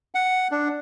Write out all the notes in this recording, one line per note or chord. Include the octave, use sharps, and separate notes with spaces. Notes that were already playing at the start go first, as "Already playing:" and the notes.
F#5
D4